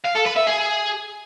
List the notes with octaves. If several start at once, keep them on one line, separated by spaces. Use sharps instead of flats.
F5
A4
B4
E5
G#4